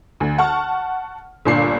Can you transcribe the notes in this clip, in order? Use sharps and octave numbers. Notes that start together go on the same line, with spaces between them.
D2
F#5 A5 C#6 F6
G1 A#2 D4 C7